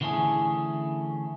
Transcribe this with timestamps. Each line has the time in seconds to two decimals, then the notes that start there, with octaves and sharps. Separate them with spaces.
0.01 D3 E3 A3 C4 C#4 G#4